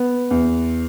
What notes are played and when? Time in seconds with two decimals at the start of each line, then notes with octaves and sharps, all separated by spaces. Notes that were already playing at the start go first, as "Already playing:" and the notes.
Already playing: B3
0.31 E2